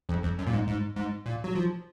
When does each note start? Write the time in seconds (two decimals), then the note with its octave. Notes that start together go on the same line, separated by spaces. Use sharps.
0.09 F2
0.23 F2
0.39 F#2
0.47 A#2
0.53 G#2
0.68 G#2
0.96 G#2
1.26 A#2
1.44 F#3
1.55 F3